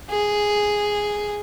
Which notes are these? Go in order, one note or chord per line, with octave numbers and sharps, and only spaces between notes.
G#4